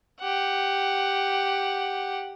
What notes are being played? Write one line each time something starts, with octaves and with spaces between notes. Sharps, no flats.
G4 F#5